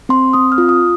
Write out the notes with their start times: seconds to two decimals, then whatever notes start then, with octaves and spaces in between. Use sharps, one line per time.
0.09 C4 C6
0.33 C4 D#6
0.52 F6
0.58 F4
0.69 D#6